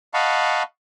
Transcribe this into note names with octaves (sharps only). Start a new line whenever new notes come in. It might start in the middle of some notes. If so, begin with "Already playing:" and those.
D#5 F5 F#5 A5 B5 C#6